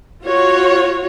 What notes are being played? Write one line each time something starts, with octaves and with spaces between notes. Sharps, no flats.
F4 F#4 C#5